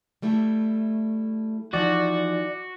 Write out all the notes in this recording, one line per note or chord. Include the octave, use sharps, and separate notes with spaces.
G3 A3 E4
E3 F3 D#4 F#4 D5